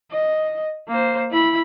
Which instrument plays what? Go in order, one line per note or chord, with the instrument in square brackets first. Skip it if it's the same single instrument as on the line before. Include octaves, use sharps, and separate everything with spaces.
[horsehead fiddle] D#5
A#3 C5
E4 B5